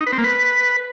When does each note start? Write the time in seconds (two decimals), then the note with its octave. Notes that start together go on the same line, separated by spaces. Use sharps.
0.01 D#4
0.07 B4
0.12 C4
0.18 A#3
0.24 B4